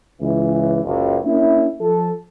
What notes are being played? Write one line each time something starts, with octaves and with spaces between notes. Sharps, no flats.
C#2 E3
F#1 C#2
A#3 C#4 D4 E4
F3 A4